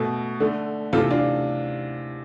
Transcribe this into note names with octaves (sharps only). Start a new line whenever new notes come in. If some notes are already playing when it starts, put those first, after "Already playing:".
Already playing: B2 A3
D3 A3
C3 E3 A3 F4 A4
D4 F4